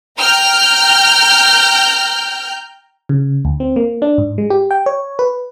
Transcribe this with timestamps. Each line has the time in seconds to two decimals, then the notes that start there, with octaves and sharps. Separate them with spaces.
0.18 G5 A#5 F6 G6
3.09 C#3
3.45 D2
3.60 C4
3.76 A#3
4.02 D4
4.18 G#2
4.38 G#3
4.50 G4
4.71 G5
4.86 C#5
5.19 B4